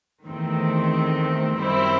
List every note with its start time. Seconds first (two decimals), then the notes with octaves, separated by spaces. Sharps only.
0.25 E2 D#3 A3 C4
1.58 F#2 D#3 G3 C4 E4